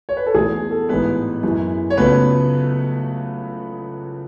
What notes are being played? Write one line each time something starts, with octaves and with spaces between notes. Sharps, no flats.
C#5
B4
A4
E2 B2 A3 G#4
A4
A1 G#2 G#3 B3 B4
F#2 E3 G#3
C#5
C#2 C#3 F#3 A3 B3 B4